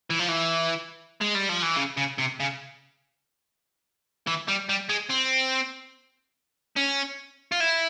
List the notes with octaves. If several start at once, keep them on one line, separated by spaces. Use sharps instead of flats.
E3
F3
E3
G#3
G3
F3
E3
C#3
C#3
C3
C#3
E3
G3
G3
G#3
C4
C#4
F4
E4